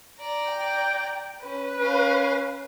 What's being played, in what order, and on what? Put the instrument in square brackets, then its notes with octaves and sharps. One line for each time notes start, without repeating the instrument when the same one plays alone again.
[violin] D5 A#5
[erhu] G5
[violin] C#4 [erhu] B4
[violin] C#4 F5